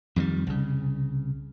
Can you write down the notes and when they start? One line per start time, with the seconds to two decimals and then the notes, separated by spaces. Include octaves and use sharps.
0.16 F2 D#3 F#3 G3
0.47 C2 C#3